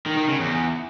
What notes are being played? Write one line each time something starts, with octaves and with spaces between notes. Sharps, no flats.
D#3
D#3
C#3
E2